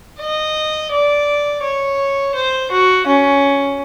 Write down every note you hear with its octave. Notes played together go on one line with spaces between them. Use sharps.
D#5
D5
C#5
C5
F#4
C#4